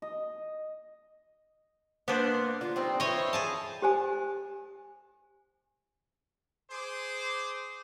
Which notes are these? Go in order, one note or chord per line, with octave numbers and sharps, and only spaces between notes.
D#5
A#3 B3 D4 C5
D3 F4
G3 C4 D#4
A3 E4 C5 C#5 D#5
G#4 G#5 A5
G4 C5 G#5
G#4 C5 D6